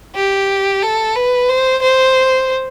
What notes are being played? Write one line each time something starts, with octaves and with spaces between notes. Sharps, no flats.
G4
A4
B4
C5
C5